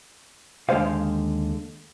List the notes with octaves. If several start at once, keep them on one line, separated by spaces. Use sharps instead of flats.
D#2 D3 G#3 C4 C5 F5